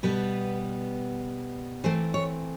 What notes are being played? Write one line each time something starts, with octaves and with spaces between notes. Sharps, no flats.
B2 G3 B3 B4
E3 A3 C4 C5
C#5